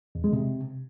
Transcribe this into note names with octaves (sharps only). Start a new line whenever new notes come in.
E2
G#3
C3